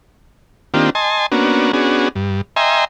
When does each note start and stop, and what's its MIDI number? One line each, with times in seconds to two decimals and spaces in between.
0.74 0.90 51
0.74 0.90 58
0.74 0.90 60
0.74 0.90 62
0.74 0.90 65
0.74 0.90 67
0.95 1.26 75
0.95 1.26 80
0.95 1.26 81
0.95 1.26 84
1.32 1.72 58
1.32 1.72 59
1.32 1.72 61
1.32 1.72 62
1.32 1.72 66
1.73 2.08 59
1.73 2.08 61
1.73 2.08 62
1.73 2.08 66
1.73 2.08 68
2.15 2.41 43
2.56 2.85 75
2.56 2.85 76
2.56 2.85 79
2.56 2.85 80
2.56 2.85 82
2.56 2.85 84